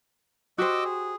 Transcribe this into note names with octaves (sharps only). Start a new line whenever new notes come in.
F#4 G4 C5 D#5 D6 E6
G#4